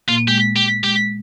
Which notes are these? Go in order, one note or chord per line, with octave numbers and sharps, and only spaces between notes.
A#2 A#3 F4
G#3 G4
G4
G#3 G4